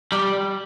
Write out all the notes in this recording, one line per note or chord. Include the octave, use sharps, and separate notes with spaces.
G3